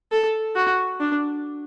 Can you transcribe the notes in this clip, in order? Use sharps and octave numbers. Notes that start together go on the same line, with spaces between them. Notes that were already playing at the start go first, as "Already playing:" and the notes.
A4
F#4
D4